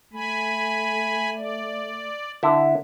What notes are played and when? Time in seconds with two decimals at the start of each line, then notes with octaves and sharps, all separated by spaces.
0.14 A3 G#5 B5
1.36 D5
2.43 D3 E4